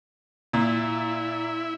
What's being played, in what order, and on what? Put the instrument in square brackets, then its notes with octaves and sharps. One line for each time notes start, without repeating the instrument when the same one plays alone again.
[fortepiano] A#2 [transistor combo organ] E4